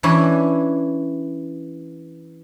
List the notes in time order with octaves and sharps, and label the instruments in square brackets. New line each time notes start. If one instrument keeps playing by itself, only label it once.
[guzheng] E3 C#4 D4 E4 C#5